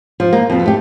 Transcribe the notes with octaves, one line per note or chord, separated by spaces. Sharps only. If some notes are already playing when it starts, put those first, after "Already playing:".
F3
A#3
F2 B2
A3 G4